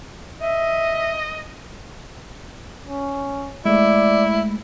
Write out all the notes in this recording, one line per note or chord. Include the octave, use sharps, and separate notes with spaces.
D#5 E5
C#4
G#3 A3 E4 D5